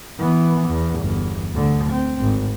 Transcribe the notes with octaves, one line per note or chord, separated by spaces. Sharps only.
E3 B3
E2
G1 E2
D2 D3
C4
G#1